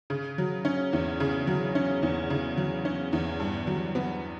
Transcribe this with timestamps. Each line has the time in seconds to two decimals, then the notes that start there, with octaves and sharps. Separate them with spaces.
0.10 C#3
0.38 F#3
0.65 C#4
0.93 E2
1.20 C#3
1.47 F#3
1.75 C#4
2.03 E2
2.30 C#3
2.57 F#3
2.85 C#4
3.13 E2
3.40 G2
3.67 F#3
3.95 B3